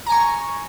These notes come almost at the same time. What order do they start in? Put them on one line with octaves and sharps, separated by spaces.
A#5 G#5 C#6